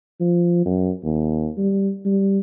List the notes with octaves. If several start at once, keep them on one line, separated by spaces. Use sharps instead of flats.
F3
F#2
D#2
G3
G3